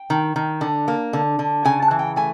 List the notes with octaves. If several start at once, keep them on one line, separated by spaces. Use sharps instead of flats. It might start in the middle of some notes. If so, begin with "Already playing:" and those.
Already playing: G5
D#3
D#3
D3
A#3
D3
D3
C#3 G#5
A5
E3
G5
A3 G#5